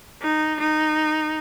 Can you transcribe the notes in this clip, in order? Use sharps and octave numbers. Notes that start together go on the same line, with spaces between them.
D#4
D#4